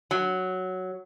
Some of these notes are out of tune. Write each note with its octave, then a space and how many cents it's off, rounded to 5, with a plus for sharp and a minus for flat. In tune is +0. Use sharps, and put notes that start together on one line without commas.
F#3 +0